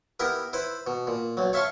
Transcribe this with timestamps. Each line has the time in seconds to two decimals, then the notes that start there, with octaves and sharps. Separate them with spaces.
0.20 B3 E4 G4 A#4
0.53 E4 B4 C5
0.87 B2
1.07 A#2
1.37 B1 F#3
1.53 C#5 E5 F5 A5 C6 C#6